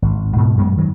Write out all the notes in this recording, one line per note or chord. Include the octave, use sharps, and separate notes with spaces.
G#1
G#2 B2
F#2 G#3 B3
D#3 F#3